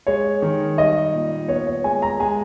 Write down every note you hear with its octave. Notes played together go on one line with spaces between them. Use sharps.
G#3 C#5
D#3
G3 D#5
A#2
B3 C#5
C#5
G#3 G#5
A#5
G#3 G#5